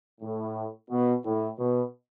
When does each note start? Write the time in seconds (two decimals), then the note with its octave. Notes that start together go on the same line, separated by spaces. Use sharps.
0.21 A2
0.90 B2
1.25 A2
1.59 B2